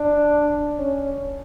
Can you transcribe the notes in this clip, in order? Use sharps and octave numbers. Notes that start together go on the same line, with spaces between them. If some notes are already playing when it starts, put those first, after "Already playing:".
Already playing: D4
C#4